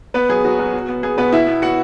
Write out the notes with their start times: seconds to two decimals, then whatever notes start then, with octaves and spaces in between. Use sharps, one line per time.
0.14 B3 B4
0.29 F#2 G#4
0.45 F#3 F#4
0.59 F#2
0.73 B2
0.88 B3
1.03 B3 G#4
1.18 B2 B3 B4
1.33 B2 E4 E5
1.48 B3
1.62 B3 F#4 F#5